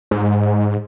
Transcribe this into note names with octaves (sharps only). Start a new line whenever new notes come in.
G#2